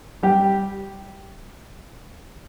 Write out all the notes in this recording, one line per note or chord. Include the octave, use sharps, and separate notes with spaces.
G3 G4